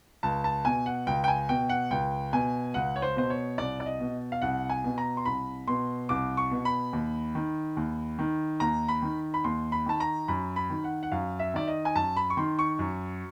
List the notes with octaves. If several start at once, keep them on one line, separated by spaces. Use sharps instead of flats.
C#2 A5
A5
B2 G#5
F#5
C#2 G5
G5
G#5
B2 G5
F#5
C#2 G5
B2 G#5
C#2 F#5
C#5
C5
B2 C5
C#5
C2 D5
D5
D#5
B2
F5
C2 F#5
G#5
B2
A#5
C6
C2 B5
B2 C6
C2 D6
C#6
B2
B5
D#2
D#3
D#2
D#3
D#2 A#5
B5
D#3
B5
D#2 C6
B5
D#3 A5
A#5
F#2 B5
B5
D#3
F#5
F#5
F#2 F5
E5
D#3 D5
D#5
G#5
F#2 A5
B5
C#6
D#3 C6
C#6
F#2